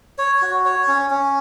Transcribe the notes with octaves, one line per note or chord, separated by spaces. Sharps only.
C#5
F#4
C#5
C#4
C#4